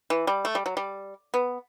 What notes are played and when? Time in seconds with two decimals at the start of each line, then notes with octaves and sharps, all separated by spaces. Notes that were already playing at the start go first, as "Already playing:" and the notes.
0.10 E3
0.27 G3
0.45 A3
0.55 G3
0.66 F#3
0.77 G3
1.34 B3